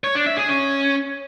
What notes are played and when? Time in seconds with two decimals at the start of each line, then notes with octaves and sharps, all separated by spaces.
0.04 C#5
0.15 D4
0.26 E5
0.38 G#4
0.49 C#4